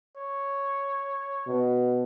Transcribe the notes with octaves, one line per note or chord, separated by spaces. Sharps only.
C#5
B2